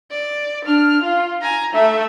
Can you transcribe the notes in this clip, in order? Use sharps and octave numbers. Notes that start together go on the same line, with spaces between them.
D5
D4 F6
F4
G#5 A#5
A3 E5